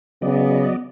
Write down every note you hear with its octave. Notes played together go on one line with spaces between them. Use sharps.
C#3 F#3 B3 D5 D#5